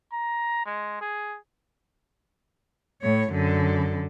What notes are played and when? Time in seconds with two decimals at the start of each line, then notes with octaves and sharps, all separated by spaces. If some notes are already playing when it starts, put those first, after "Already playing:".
0.13 A#5
0.66 G#3
1.01 G#4
3.02 A2 C#5
3.32 F#2 D3